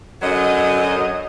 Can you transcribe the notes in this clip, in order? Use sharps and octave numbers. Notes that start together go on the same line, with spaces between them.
F#2 D3 F#3 D#5